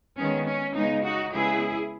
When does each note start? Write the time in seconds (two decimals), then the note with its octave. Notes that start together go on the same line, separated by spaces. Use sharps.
0.17 D#3 G#3 B3 C#4
0.46 C#4
0.75 C#3 G#3 B3 D#4
1.04 D#4 F#4
1.33 C#3 G#3 B3 E4 G#4